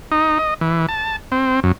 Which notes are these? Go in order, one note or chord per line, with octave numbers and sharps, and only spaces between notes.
D#4
D#5
E3
A5
C4
F#2